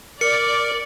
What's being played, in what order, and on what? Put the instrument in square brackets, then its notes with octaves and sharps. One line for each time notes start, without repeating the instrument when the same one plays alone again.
[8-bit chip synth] A#4 [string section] D5 [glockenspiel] C#7